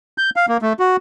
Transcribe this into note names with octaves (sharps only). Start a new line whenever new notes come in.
G6
F5
A#3
A3
F#4